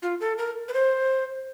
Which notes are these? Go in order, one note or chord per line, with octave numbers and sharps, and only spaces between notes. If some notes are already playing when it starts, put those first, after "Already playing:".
F4
A4
A#4
B4
C5